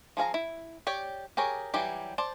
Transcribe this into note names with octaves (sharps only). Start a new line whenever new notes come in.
F3 G#4 F5 A#5
E4
G4 C#5 D5 G5
G4 G#4 A#4 C#5
E3 F#3 G3 G4
C5 D5 A5